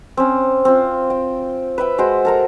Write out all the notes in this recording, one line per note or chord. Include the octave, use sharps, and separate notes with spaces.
C4 C#4
C4 F4
G5
B4 E5 G5
G#3 F#4 C5 G5
A4 A#4 A#5